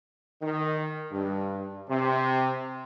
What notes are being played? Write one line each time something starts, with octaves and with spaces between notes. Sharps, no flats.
D#3
G2
C3